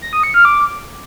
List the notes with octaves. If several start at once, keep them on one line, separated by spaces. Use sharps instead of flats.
A#6
D#6
C#7
F6
D6